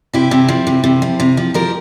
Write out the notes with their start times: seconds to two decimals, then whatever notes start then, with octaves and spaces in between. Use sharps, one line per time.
0.13 C3 E4 G4
0.31 C3
0.48 F3
0.67 C3
0.84 C3
1.02 F3
1.20 C3
1.37 F3
1.54 F3 G4 A#4